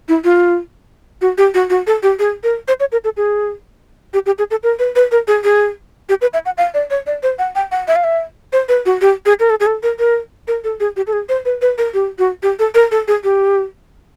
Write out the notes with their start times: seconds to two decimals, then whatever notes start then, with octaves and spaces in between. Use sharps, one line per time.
0.08 E4
0.24 F4
1.21 F#4
1.38 G4
1.54 F#4
1.70 F#4
1.87 A4
2.03 G4
2.19 G#4
2.43 A#4
2.68 C5
2.80 C#5
2.92 A#4
3.04 A4
3.17 G#4
4.14 G4
4.26 G4
4.38 G#4
4.51 A4
4.63 A#4
4.79 B4
4.96 B4
5.11 A#4
5.27 G#4
5.44 G#4
6.09 G4
6.21 B4
6.33 E5
6.45 F#5
6.57 F5
6.74 D5
6.90 C#5
7.06 D5
7.23 C5
7.39 F#5
7.55 G5
7.71 F#5
7.88 E5
7.96 F5
8.04 E5
8.53 C5
8.68 B4
8.86 F#4
9.01 G4
9.26 G#4
9.40 A#4
9.50 A4
9.60 G#4
9.66 A4
9.83 A#4
9.99 A#4
10.48 A#4
10.64 A4
10.80 G#4
10.96 G4
11.07 A4
11.13 G#4
11.29 C5
11.45 B4
11.62 B4
11.78 A#4
11.94 G4
12.18 F#4
12.43 G4
12.59 A4
12.75 A#4
12.91 A4
13.08 G#4
13.24 G4